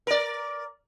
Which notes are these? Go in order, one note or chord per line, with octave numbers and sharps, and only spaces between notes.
A#4 D5